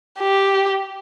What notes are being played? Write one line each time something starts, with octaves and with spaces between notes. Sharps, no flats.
G4